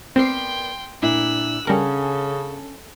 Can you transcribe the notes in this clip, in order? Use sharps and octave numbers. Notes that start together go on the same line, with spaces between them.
B3 C4 A#4 D5 G5 C6 C7
A#2 D4 E4 E6 F#6
C#3 G3 C#4 A4 A#4 F#5 A5